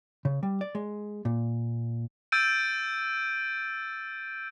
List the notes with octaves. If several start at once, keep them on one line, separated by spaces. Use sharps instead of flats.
C#3
G3
D5
G#3
A#2
E6 G6 A6 D7 D#7